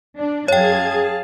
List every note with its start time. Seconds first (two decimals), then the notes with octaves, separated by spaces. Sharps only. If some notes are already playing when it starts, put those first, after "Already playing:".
0.18 D4
0.48 F#2 G#4 C#5 F5 G5 A5 G#6